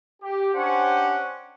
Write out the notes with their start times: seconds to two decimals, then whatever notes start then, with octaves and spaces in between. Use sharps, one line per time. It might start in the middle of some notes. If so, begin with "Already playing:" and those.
0.23 G4
0.54 C#4 D4 G4 C5 F#5